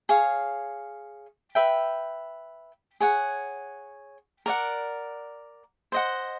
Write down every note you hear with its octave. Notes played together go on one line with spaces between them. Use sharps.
G#4 C#5 F5
B4 E5 G5
G#4 C#5 F#5
A#4 D5 F#5
C5 D#5 F#5